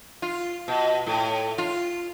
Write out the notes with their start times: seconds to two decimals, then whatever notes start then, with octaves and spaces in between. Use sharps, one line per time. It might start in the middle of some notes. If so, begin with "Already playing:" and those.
0.22 F4
0.68 B2
1.06 A2
1.58 F4